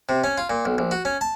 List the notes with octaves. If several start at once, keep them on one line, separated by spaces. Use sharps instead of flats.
C3
C#4
F4
A#2
B1
A#1
F#4
C#4
A5